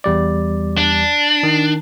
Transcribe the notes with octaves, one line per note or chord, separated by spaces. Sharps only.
E2 G3 D5
D4
D#3